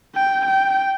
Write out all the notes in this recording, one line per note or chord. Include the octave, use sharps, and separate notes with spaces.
G5
G5